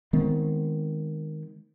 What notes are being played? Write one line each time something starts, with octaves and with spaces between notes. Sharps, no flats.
D#3 G#3 B3 C4